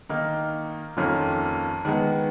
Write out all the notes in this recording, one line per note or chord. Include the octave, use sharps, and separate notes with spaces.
D#3 A#3 D#4
F2 D#3 A#3 C#4 F4
D#3 G#3 B3